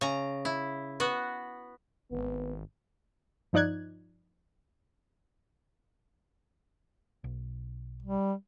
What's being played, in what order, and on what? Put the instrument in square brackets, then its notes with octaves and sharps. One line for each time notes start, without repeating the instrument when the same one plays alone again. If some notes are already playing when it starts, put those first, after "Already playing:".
[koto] C#3 A#5
E4
B3 F#4
[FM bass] G#1 [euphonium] B3
[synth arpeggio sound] G2 F3 D#4 D5 F#6 G#6
[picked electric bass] B1
[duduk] G3